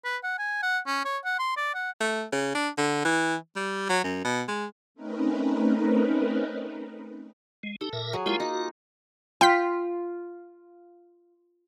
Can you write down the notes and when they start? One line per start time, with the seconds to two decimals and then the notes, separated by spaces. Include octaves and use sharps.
0.04 B4
0.23 F#5
0.39 G#5
0.63 F#5
0.86 C#4
1.05 C#5
1.25 F#5
1.39 C6
1.57 D5
1.74 F#5
2.01 A3
2.32 C#3
2.55 D4
2.78 D3
3.05 E3
3.56 G3
3.89 F#3
4.04 F#2
4.24 B2
4.48 G#3
4.94 A3 C4 C#4 D#4 A#4 B4
7.63 G#3
7.81 D#4 G4 A4
7.93 A#2 A#4 E5
8.13 F#3 G#4
8.26 G#3 A#3 E4 F4 G4
8.40 D#4 F#4
9.41 F4 G5 B6